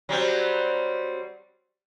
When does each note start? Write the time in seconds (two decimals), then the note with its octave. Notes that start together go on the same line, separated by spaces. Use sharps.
0.09 F#3 G3 C4